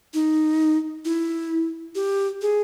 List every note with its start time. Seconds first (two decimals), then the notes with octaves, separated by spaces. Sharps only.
0.14 D#4
1.05 E4
1.95 G4
2.42 G#4